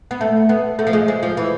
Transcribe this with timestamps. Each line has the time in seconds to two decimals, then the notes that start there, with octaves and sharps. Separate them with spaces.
0.11 B3
0.21 A3
0.49 B3
0.79 A3
0.87 F3
0.93 G#3
1.08 G#3
1.23 F3
1.37 E3